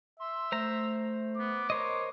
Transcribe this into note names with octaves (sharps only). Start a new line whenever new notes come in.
E5 C6
A3 C5 A#5
B3 D6
A#4 C5 C#5 D#5